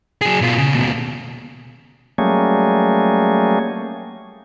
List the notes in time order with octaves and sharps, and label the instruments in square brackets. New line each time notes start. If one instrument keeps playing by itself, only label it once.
[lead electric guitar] F#3 G#4
B2 F4
C#3
D#2 B2
[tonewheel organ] F#3 G3 A3 A#3 C#4 G#4